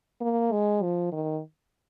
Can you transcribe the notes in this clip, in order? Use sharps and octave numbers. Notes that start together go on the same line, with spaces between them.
A#3
G#3
F3
D#3